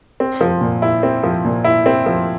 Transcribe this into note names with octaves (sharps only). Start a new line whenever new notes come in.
C4
F3
A#2
E4
C4
F3
A#2
E4
C4
F3